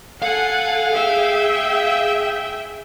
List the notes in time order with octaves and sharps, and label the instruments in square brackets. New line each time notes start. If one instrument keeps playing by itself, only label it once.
[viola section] A4 F#5 G#5 [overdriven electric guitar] F5
[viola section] G#4 E5 G5